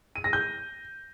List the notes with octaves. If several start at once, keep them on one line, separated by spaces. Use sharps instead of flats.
D#7
A#6
G6